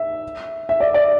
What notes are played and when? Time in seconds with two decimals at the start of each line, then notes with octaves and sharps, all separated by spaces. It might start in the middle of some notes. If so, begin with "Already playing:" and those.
Already playing: E5
0.69 E5
0.80 D5
0.94 D5